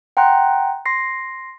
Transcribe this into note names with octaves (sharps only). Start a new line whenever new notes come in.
F#5 G5 A#5 C6 F#6
C6 A#6 C7